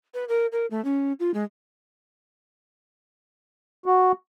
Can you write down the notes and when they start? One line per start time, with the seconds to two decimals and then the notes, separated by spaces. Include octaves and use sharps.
0.14 B4
0.29 A#4
0.52 A#4
0.71 A3
0.85 C#4
1.20 F4
1.34 G#3
3.86 F#4